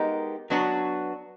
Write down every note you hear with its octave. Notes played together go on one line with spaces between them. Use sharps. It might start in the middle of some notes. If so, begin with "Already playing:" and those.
Already playing: G#3 B3 D#4 G4 A#4
F#3 B3 D4 F#4 B4